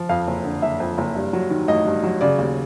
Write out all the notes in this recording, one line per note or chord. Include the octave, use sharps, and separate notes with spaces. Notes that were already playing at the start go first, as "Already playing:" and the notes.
Already playing: F3
F2 F5
F#1
D3
F#1 E5
F2
F#1
G2
F#3
D#3
A1 D#5
G2
F#3
C#3 D5
D#2